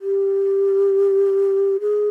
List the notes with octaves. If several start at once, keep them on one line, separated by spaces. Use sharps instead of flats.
G4
G#4